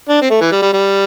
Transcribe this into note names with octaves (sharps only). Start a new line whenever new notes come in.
D4
C4
A3
E3
G3
G3
G3